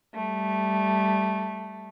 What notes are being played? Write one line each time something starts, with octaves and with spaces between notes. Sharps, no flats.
G3 A3